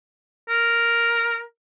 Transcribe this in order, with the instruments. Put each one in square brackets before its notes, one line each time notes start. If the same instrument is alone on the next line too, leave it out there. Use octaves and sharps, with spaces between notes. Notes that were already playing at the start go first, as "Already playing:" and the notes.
[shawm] A#4